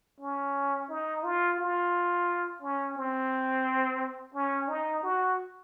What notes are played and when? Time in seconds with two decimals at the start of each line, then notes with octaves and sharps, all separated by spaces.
0.20 C#4
0.90 D#4
1.24 F4
1.59 F4
2.62 C#4
2.97 C4
4.34 C#4
4.68 D#4
5.03 F#4